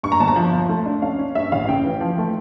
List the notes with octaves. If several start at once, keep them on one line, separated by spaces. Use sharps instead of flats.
G2 C#6
A#5
G1 A5
A#5
F3
F3
A3
D4
C#4 F5
C#4
G2 E5
A1 F5
C#3 G5
E3
F3
A3